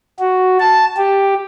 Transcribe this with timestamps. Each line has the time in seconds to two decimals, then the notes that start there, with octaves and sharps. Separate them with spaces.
0.19 F#4
0.60 A5
0.97 G4